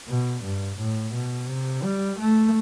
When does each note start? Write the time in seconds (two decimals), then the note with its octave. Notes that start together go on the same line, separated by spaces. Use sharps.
0.08 B2
0.43 G2
0.78 A2
1.14 B2
1.49 C3
1.83 G3
2.19 A3